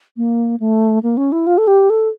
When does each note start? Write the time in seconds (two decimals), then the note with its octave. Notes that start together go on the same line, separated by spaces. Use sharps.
0.17 A#3
0.60 A3
1.03 A#3
1.17 C#4
1.32 E4
1.47 F4
1.58 A4
1.67 G4
1.90 A4